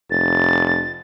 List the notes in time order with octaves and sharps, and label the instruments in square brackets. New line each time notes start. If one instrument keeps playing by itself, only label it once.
[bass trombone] F1 [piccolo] A6